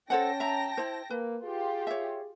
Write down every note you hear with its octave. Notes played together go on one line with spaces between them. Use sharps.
C#4 A4 C5 F#5 G5 A5 A#6
E5 A#5
E4 C5
A#3 B4
F4 G4 G#4
C#5 E5